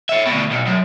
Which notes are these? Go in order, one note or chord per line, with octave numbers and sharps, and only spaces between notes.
C#5 E5
D2 B2
B1
F#2